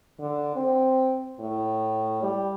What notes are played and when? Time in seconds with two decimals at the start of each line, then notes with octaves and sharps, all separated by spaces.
0.19 D3
0.56 C4
1.39 A2
2.22 G3